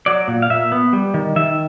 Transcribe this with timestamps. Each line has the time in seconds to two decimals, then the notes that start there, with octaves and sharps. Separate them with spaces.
0.06 F#3 D5
0.28 A#2
0.42 F5
0.50 A#2 E5
0.72 B3
0.93 G3
1.14 D#3
1.36 D#3 E5